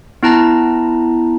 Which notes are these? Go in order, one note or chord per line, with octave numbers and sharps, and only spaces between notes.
B3 E4 A5 A#5